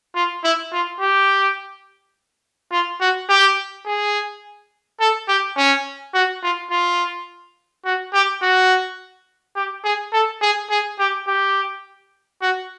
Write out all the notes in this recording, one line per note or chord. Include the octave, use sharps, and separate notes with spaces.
F4
E4
F4
G4
F4
F#4
G4
G#4
A4
G4
C#4
F#4
F4
F4
F#4
G4
F#4
G4
G#4
A4
G#4
G#4
G4
G4
F#4